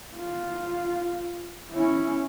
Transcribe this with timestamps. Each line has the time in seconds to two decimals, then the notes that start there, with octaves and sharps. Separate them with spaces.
0.16 F4
1.71 C#4 E4